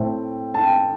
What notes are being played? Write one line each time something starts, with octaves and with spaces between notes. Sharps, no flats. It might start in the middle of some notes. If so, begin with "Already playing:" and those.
Already playing: A2 A3 C4 G5
A5
G5